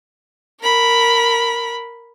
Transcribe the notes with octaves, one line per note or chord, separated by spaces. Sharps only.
A#4 B5